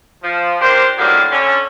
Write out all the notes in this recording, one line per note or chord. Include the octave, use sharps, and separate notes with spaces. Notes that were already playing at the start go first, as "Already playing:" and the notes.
F3
D4 G4 A#4 C5
A2 D3 D#3 F#3 G3 A#3
D3 C#4